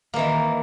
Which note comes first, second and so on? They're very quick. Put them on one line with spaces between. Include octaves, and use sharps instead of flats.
A#3 E3 D#3